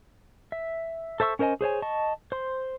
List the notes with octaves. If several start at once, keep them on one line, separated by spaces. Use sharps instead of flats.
E5
A4 C5 E5 C#6 E6
C#4 A#4 C5 D#5 G#5
G#4 C5 C#5 G#5
D#5 A5 C#6
C5 C6